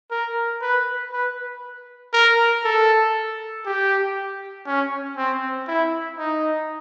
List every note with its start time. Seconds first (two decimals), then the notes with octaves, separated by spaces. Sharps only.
0.11 A#4
0.61 B4
1.12 B4
2.13 A#4
2.64 A4
3.66 G4
4.66 C#4
5.17 C4
5.68 E4
6.18 D#4